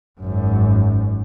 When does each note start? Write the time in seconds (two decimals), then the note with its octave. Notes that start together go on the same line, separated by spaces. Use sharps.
0.21 G#1 F#2